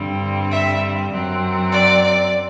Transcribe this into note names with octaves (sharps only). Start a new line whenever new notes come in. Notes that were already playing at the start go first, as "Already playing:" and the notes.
Already playing: G2 D3 G3 C4
E5
F#2 F#3 C4
D5
D5